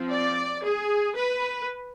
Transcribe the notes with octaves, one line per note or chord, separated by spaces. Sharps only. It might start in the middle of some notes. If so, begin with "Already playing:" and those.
Already playing: F3 C4
D5
G#4
B4